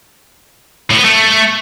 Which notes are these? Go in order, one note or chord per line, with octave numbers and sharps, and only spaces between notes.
A2
B3
A3